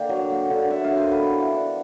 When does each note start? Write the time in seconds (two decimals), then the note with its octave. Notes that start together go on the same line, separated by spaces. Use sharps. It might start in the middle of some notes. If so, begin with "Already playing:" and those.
Already playing: D3 A#3 F5 G5
0.09 F#3
0.30 A#3
0.50 D3
0.70 D3 E5 F#5
0.84 D#5 F5
0.91 F#3
0.97 A#4 C5
1.11 B3 A4 B4
1.32 E3
1.52 D4